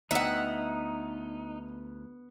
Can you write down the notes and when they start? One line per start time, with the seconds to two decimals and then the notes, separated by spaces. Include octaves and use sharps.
0.11 D2 B3 D#4 E5 F#5